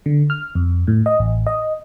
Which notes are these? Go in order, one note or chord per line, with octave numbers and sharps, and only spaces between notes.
D3
F6
F2
A2
D#5
A1
D#5